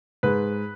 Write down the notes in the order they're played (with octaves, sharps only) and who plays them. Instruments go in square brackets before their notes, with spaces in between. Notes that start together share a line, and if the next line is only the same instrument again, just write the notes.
[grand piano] G#2 B4